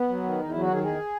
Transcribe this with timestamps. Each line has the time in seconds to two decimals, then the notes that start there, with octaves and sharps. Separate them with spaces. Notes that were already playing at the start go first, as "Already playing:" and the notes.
Already playing: B3
0.09 F#3
0.24 D#3
0.39 E2 D#4
0.49 F#3 E4
0.61 F#4
0.68 D#3 G#4
0.83 E2 G#4